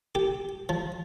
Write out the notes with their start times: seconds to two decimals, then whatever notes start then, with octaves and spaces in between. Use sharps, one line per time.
0.15 G4
0.69 F3